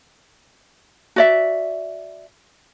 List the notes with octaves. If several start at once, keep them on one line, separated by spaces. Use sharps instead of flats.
F#4 D5 E5